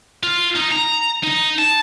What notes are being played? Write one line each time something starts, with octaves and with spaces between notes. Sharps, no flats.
F4
D#4
A#5
D#4
A5